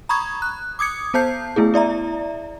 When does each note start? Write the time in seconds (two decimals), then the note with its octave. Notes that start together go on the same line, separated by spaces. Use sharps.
0.09 A#5 B5 C#6 D#6 G#6
0.42 F#6
0.79 D6 D#6 G#6 C#7
1.14 B3 C5 A5 G6 C7
1.56 A3 B3 E4 G#4
1.74 E4 D5 E5 A#5